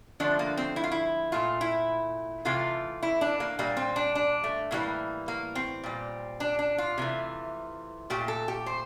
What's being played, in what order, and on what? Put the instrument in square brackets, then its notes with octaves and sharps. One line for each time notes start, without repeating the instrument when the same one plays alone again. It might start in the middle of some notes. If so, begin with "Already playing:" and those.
[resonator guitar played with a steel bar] D3 F3 A3 D4
A#3
C4
E4
F4
E4
A#2 A3 F4
E4
C3 E3 A3 F4
E4
D4
A#3
A#2 G3 A#3
C4
D4
D4
A3
A2 E3 G3 A#3
A#3
C4
A#2 G3
D4
D4
F4
C3 E3 A3
A#2 A3 G4
A4
G4
C5